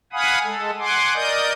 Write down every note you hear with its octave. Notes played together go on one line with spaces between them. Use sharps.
F5 F#5 G#5 B5 D#6
G#3 A4
F#5 G#5 C6 D6
A#4 D5 D#5 D#6 G6